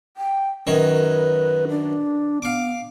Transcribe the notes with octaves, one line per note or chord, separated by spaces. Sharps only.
G5
F#2 D#3 B4 C#5
D4
B3 F5 D6